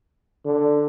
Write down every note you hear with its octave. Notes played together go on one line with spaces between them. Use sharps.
D3